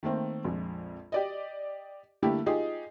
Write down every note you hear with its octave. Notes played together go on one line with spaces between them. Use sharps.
D#3 A3 A#3 C4
A#1 F2 G#3
G4 D5 D#5
D3 G3 A3 A#3 E4 G4
D#4 F4 G4 G#4